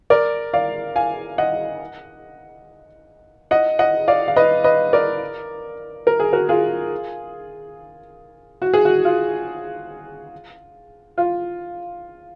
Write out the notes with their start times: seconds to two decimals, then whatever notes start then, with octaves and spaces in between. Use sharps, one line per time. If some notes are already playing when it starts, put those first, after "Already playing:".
0.10 A#4 D5
0.53 D5 F5
0.96 F5 G#5
1.38 D#5 F#5
3.51 D#5 F#5
3.79 D#5 F#5
4.08 D5 F5
4.28 F5
4.36 B4 D#5
4.64 B4 D#5
4.93 A#4 D5
6.07 A#4
6.20 G#4
6.33 F#4 A#4
6.49 F4 G#4
8.62 F#4
8.74 G#4
8.85 F#4
9.05 F4
11.18 F4